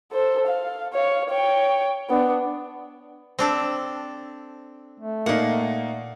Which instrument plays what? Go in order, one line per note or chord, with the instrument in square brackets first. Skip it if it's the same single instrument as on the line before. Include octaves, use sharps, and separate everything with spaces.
[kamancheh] A4 C5
F5
C#5 F5
C#5 G5
B3 D4
[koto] C4 D4 A4
[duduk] A3
[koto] A#2 F#5 [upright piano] A#3 D#4